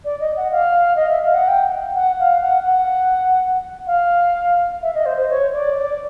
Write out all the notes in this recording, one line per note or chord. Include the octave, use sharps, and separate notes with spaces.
D5
D#5
F#5
F5
D#5
E5
F5
F#5
G5
F#5
F5
F#5
F#5
F5
E5
D#5
C5
C5
C#5
D5
D5